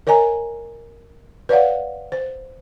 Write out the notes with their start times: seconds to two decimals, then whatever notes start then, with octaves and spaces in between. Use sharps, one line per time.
0.07 A#4 C#5 D#5 G#5 A#5
1.49 B4 C#5 D5 F5 F#5
2.12 C5